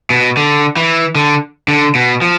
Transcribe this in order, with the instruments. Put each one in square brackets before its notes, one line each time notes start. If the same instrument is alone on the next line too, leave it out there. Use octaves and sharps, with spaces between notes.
[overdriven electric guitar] B2
D3
E3
D3
D3
B2
F3